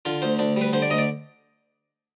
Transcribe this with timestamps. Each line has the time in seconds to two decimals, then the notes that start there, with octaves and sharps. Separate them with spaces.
0.05 D3 F4
0.22 D2 C5
0.39 D2 D4
0.56 G3 B4
0.73 D3 C5
0.82 D5
0.91 D2 D#5
0.98 D5